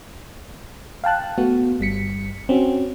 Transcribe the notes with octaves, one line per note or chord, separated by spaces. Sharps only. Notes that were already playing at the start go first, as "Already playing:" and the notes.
F5 G5 A5 F#6
A3 B3 F#4
G1 G3 B6 C#7
C4 C#4 F#4